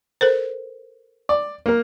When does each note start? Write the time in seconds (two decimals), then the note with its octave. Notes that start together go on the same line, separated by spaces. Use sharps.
0.21 A4 A#4 C5
1.29 D5
1.66 A#3 A#4